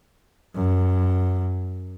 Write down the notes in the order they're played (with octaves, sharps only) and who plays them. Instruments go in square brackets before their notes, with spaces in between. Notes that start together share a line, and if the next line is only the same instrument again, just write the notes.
[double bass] F#2